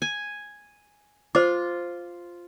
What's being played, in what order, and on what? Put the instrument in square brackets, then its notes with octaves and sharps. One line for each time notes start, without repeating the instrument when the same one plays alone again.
[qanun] G#5
[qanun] F4 [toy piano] C5 D6